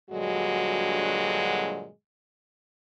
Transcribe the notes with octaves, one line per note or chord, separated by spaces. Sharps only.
G2 A#2 D3 F#3 G#3 F#4